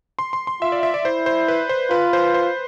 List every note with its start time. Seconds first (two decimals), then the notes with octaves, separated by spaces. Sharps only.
0.19 C6
0.33 C6
0.47 C6
0.61 F4 E5
0.72 D5
0.83 E5
0.94 D5
1.05 E4 C5
1.26 C5
1.48 B4
1.69 C5
1.91 F4 B4
2.13 C5
2.34 C5